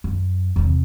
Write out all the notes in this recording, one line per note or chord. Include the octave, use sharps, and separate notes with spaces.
F#2
E2 C3